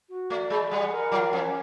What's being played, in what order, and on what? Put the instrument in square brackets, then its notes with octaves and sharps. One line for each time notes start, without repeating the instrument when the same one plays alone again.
[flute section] F#4
[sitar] A3 [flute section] D5
[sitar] G#3 [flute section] B5
[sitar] G3 [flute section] F#5
[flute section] A#4
[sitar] F#3 [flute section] F4
[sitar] F3 [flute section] C#4